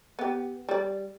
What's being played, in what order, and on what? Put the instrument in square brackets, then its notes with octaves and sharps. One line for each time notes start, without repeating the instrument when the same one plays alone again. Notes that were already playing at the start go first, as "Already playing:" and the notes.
[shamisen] B3 G4
G3 D5